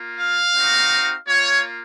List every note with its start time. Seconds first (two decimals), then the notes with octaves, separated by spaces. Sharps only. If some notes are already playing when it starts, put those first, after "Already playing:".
Already playing: A#3 F4
0.17 F5
0.54 C4 D#4 F#4
1.28 A#3 F4 C#5